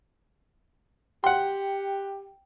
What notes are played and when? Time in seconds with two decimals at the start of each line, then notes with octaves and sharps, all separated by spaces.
1.24 G4 F#5 G5 C6